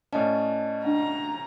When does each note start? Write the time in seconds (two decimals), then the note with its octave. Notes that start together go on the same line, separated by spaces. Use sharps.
0.13 A2 C#4 D5 D#5 A5
0.85 D4 F#5 A#5